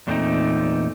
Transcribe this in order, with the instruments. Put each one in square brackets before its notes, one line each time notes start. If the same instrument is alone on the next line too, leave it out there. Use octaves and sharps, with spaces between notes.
[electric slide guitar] E2 A#2 F#3 A3 C4 D#4